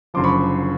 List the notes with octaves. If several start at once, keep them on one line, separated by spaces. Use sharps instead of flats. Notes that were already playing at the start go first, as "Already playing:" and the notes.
F#1 F#2 D3 F3 C6 D6
B5 C#6